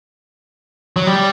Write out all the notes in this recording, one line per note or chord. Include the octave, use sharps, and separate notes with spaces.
F#3
G3